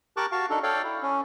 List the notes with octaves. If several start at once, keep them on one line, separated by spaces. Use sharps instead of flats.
G4 A#4 A5 C#6 D6 F#6
F#4 F5 A5 C#6
D4 D#4 A4
A4 C#5 D5 F5 G5
E4
C#4